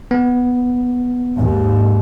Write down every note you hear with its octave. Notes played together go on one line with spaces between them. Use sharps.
B3
D#2 G#2